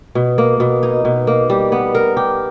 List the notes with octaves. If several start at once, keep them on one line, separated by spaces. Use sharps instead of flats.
B2
A#3
B2
D#4
B2
A#3
G3
B3
A#4
G4